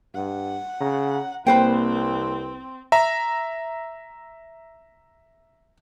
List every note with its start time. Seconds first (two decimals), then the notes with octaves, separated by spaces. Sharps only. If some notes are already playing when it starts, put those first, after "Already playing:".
0.14 G2 F#5
0.81 C#3 A#5
1.47 C2 A#3 C4 B4 C5 G5
2.92 E5 A#5